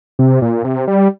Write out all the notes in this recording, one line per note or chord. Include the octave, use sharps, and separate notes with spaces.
C3
A#2
C3
G3